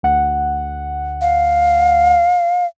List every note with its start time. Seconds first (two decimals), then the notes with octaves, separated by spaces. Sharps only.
0.03 D2 F#5
1.22 F5